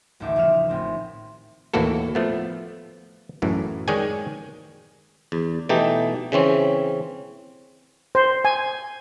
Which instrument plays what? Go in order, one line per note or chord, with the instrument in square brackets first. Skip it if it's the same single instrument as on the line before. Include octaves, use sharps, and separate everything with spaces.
[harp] D#1 A1 D2 D#4 E5 D6
D#1 C#3 F3 F6 E7
A1 C4
[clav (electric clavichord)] D#2 A2 E3 A#3 F#4 A4
F3 A3 B3
F#2 A2 E3
D#3 G#3 C#5 D5 G5 G#5
E2
B2 E3 A3 D#4 G4
C#3 E3 C4 C#4
[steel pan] C5
G#5